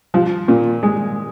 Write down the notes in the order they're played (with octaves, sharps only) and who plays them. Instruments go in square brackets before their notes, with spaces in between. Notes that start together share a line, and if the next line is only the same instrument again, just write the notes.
[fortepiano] F3
A#2
G#3